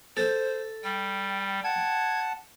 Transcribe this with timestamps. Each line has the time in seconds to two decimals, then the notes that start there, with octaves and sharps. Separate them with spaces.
0.17 A4 C5
0.84 G3 G5
1.64 F#5 A5 G#6